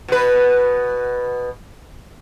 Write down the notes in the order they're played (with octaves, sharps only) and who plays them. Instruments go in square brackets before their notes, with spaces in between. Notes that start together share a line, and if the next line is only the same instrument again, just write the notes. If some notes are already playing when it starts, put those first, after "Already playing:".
[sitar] B2 B4